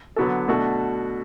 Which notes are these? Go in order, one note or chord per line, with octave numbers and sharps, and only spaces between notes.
D3 F#3 B3 F#4 A4
B2 A3 D4 F#4 A4